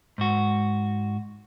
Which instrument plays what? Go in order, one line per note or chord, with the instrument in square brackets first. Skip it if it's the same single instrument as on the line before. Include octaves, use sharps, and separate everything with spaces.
[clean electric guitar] G#2 F#4